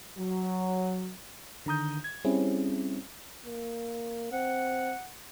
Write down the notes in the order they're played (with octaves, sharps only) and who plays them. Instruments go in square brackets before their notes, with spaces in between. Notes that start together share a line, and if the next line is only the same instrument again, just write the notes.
[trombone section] F#3
[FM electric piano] D3 D#3 A#5 D#6 G6
G#6
G3 C4 C#4 E4 G#4
[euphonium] A#3
[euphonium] C4 [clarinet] F#5